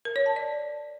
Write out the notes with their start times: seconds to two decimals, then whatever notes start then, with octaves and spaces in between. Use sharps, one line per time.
0.05 A#4
0.16 C#5
0.26 A5
0.36 D5